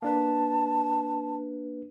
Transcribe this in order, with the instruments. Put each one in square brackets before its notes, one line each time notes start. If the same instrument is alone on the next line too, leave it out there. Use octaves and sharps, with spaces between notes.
[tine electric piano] A#3 D4 B4 [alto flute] A5